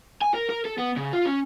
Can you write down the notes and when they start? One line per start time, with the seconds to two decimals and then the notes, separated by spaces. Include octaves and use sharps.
0.22 G#5
0.34 A#4
0.50 A#4
0.65 A4
0.78 B3
0.97 C#3
1.13 F4
1.26 C#4